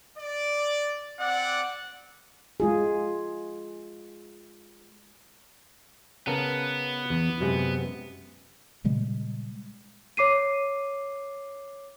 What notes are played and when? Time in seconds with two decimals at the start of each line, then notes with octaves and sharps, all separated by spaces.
0.18 D5
1.20 C4 D5 F#5
2.60 G#3 F4 G#4
6.27 C#3 B3 A#4 A5
7.10 E2
7.40 F#2 C3 G#3
8.84 A#2 C#3 G3 G#3
10.17 C#5 D6 C7 D#7